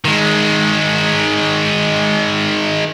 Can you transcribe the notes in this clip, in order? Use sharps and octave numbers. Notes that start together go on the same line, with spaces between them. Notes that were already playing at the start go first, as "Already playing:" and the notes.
D#3 G#3